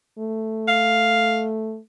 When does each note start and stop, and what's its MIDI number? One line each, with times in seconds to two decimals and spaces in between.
0.19 1.79 57
0.68 1.48 77